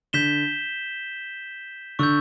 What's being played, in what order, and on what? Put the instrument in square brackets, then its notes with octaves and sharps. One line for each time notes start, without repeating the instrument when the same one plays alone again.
[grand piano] D3 [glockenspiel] G6 B6 E7 G7
[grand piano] D3 [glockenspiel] C#6 E6 G6